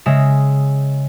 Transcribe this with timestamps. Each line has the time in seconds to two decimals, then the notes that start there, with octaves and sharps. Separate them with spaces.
0.06 C#3 G#3 E5 A#6